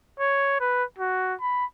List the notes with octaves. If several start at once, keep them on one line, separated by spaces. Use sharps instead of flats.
C#5
B4
F#4
B5